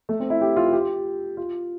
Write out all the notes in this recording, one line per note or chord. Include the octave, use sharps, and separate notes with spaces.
A3
C4
E4
G4
F4
G4
F4